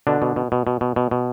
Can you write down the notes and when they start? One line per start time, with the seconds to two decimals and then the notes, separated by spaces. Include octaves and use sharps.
0.07 B2 D3 D4
0.22 B2
0.36 B2
0.52 B2
0.67 B2
0.81 B2
0.96 B2
1.11 B2